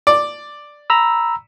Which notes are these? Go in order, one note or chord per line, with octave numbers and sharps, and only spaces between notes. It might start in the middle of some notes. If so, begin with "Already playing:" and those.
D5
A#5 B5 E6